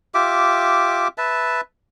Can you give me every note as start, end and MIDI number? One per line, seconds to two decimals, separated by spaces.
0.14 1.08 65
0.14 1.08 67
0.14 1.08 76
0.14 1.08 86
1.18 1.61 71
1.18 1.61 76
1.18 1.61 81